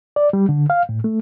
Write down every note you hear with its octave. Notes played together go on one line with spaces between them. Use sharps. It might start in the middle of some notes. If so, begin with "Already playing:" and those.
D5
G3
D3
F5
A2
A3